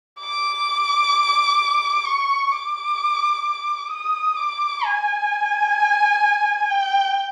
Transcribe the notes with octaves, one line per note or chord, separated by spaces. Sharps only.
D6
C#6
D6
D#6
D6
G#5
G5